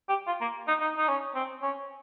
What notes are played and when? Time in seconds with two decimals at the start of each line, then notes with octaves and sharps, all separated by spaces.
0.09 G4
0.27 F4
0.41 A#3
0.68 D#4
0.80 D#4
0.97 D#4
1.08 C#4
1.34 C4
1.62 C#4